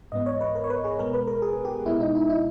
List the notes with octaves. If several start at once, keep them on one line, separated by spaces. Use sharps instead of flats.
G#2 E3 G#3 B3 D#5
C#5
B4
A#4
C#5
B4
G#4
B2 G#3 B3 A#4
B4
A#4
G#4
G4
B2 G#3 B3 E4
D#4
E4
E4